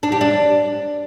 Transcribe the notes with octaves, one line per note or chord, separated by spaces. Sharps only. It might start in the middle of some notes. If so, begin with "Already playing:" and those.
D4
G4
D4